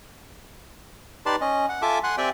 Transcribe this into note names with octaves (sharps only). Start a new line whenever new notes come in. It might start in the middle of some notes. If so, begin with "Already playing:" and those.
D#4 G4 B4 D5 A5 C6
C#4 D#5
F#5
F4 A4 E5 G#5 A5 D6
F#5 G#5 C6 F#6
C4 G4 D5 E5 G5 G#5